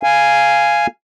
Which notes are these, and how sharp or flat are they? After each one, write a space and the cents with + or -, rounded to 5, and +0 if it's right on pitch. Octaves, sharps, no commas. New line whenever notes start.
F5 -10 G#5 +0